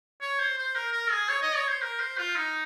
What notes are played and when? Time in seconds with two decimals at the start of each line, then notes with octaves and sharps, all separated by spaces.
0.21 C#5
0.39 C5
0.58 C5
0.75 A#4
0.92 A#4
1.11 G#4
1.29 C#5
1.42 D#5
1.56 C#5
1.68 C5
1.82 A#4
2.00 C5
2.18 F4
2.36 D#4